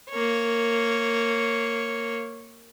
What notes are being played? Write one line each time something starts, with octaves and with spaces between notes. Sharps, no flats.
A#3 C#5